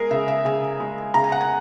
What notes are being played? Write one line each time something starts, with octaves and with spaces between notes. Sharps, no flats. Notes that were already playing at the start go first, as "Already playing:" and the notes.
Already playing: G#3 G#4 A#4
C#3 E5
E5
C#3 G#5
G#3
C#3 A#5
G#5
F#5
G#5